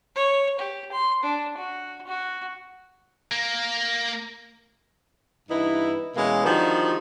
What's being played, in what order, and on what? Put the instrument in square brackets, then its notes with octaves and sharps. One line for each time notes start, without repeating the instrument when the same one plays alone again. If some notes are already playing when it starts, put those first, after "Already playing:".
[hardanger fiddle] C#5
G4
C6
D4
F#4
F#4
[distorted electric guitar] A#3
[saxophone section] G2 E3 B3 D#4 E4
B2 E3 G#3 A#3 C#4
D3 D#3 F3 G3 D#4 F#4